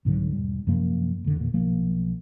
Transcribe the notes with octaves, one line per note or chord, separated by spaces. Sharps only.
C2 G#2 D3 F#3
E1 G3
F#2 C3 F3 A#3
F1 D3
E2 A#2
B1 F3 A#3